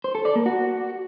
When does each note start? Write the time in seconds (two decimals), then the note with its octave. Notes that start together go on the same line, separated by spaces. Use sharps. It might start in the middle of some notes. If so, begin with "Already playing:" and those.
0.04 C5
0.15 A4
0.25 D5
0.35 A#3
0.46 F#4